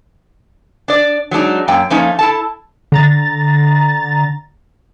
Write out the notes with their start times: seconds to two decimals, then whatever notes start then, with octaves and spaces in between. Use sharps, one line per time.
0.88 D4 D5
1.31 F#3 G#3 D4 D#4
1.68 F#2 A#3 G5
1.90 F3 A3 A#3 C#4 D#4
2.19 E4 A4 A5
2.92 D3 A#5 A6